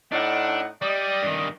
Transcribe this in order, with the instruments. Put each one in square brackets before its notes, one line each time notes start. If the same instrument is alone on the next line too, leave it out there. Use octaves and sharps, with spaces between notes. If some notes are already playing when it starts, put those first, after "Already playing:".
[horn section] A2 D#4 F#5 [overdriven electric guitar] D4
[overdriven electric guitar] G3 [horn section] D5 D#5
[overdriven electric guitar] G2 D#3